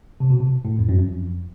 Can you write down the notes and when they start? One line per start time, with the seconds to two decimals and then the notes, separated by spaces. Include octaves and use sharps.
0.20 C3
0.30 B2
0.40 C3
0.65 A2
0.79 F2
0.89 F#2
0.98 F2